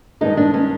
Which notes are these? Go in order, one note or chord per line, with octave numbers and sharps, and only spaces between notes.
G2 D#3 G#3 D#4
D4
C#4